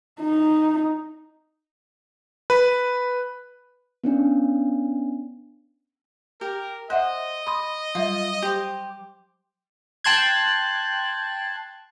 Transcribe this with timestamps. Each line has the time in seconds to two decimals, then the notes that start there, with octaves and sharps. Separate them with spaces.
0.21 D#4
2.50 B4
4.04 B3 C#4 D4
6.41 G4 A#4
6.90 C5 D#5 E5 F#5 F#6
7.47 B5 C6 D#6
7.95 F#3 G3 F4 E5
8.42 G4 C5
10.04 G5 A5 C6 F#6 G#6